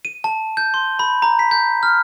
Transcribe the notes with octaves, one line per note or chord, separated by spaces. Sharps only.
D#7
A5
G6
C6
B5
A#5
B6
G6
F6